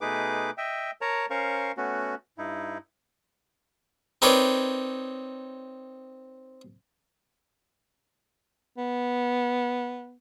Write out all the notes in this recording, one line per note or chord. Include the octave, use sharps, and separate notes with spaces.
B2 A3 D#4 G#4 B4 D6
D#5 E5 G5
A#4 C#5 A5 A#5
C#4 A#4 C5 F5 C#6
A3 B3 C#4 F#4
G2 D#4 E4
C4 D#4 A#4 B4 C#5 D5
B3